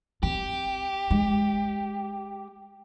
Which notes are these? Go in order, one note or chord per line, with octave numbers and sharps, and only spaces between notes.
C4 G4
G#3